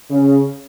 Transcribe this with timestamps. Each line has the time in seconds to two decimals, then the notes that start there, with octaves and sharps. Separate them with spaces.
0.10 C#3